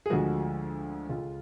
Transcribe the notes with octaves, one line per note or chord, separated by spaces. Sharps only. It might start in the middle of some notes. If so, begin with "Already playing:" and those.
G#4
D2 D3 F3 G#3 F#4
C#2 C#3 G#3 F4